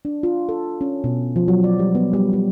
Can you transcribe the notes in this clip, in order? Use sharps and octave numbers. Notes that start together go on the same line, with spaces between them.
D4
F4
A4
C#4
B2
F3
F#3
D5
G3
B3
G3
G3